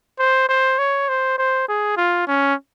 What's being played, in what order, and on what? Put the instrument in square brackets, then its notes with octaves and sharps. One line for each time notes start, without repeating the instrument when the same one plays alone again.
[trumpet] C5
C5
C#5
C5
C5
G#4
F4
C#4